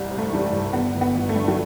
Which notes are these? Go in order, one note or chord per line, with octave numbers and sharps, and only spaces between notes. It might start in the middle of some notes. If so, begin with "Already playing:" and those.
Already playing: C2 G3
C3
A3
E3 G3
A3
C2
G1 B3
G1
B3
G1
A3
G2
F#3